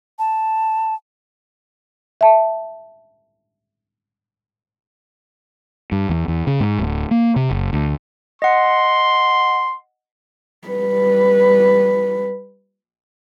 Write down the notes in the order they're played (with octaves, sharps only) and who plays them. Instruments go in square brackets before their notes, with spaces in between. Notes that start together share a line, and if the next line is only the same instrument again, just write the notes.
[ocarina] A5
[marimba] E5 A5
[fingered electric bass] G2
E2
E2
C#3
G#2
D1
A#3
C3
F#1
D2
[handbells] D#5 F#5 [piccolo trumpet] C6
[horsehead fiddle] G3 B4